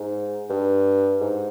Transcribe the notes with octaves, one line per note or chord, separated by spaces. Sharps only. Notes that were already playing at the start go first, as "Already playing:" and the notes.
Already playing: G#2
G2
G#2